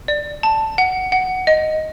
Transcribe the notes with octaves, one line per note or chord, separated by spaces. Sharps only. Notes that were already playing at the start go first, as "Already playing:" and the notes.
D5
A5
F#5
F#5
D#5